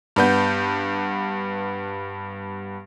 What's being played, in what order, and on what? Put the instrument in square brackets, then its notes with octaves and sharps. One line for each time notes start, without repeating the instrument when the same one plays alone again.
[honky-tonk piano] G2 B3 G6